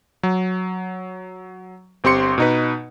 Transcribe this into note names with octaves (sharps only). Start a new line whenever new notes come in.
F#3
G1 C4 G4 C6 C#7
B2 D#4 B4